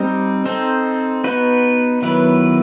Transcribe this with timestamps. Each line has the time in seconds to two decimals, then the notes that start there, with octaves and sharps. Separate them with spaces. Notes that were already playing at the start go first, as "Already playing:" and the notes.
Already playing: G3 C4 D#4
0.45 C4 D#4 A4 C5
1.24 B3 D#4 F#4 B4
2.02 D#3 F#3 B3 E4 B4